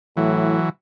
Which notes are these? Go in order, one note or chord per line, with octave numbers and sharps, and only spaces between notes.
A2 E3 F#3